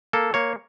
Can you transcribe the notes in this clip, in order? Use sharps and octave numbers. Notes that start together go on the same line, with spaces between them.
A#3 A4
A#3 C#5